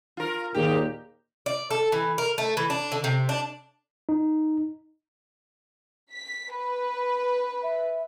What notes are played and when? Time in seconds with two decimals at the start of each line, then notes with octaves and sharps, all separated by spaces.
0.17 F4 A#4
0.55 D#2 A#2 D#3 G4 G#4
1.46 D5
1.71 A4
1.92 E3
2.18 A#4
2.38 A3
2.57 E3
2.70 D4
2.92 D3
3.04 C3
3.29 D4
4.09 D#4
6.13 B6
6.52 B4 B5
7.63 E5